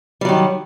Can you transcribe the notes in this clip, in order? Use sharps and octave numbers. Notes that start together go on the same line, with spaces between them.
D#3 F#3 G3